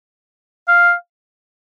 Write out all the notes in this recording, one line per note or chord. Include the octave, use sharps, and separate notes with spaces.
F5